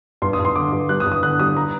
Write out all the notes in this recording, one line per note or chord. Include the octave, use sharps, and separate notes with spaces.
G2 C6
D#6
G2
C6
D3 D6
G2
G3 F#6
D#6
G2
D#6
D3 F#6
G3 D#6
A#5